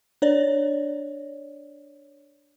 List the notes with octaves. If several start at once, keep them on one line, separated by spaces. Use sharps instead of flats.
D4 C#5 D5